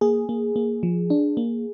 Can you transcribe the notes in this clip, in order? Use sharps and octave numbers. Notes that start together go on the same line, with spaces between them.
A#3 G#4
A#3
A#3
F3
D4
A#3